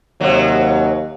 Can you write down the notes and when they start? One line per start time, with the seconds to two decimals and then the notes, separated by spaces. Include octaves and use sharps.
0.21 D#2 C3 F#3